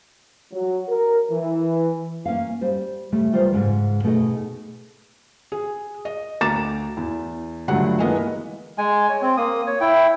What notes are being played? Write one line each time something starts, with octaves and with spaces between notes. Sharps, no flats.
F#3
A#4
E3
A#3 C#4 F5
G3 C5
C#3 G3 A3
E3 G3 F4 A#4 C5
G#2 C#3 G#3
B2 A3 D#4 G#4 D#5
G#4
D#5
D2 A#5 D6 A6 E7
E2
C#2 G2 D3 F#3 A3 F#5
E3 G#3 A#3 B3 D#5 G#5
G#3 G#5
C#5
C4
A#3 D#6
C#5
E4 G5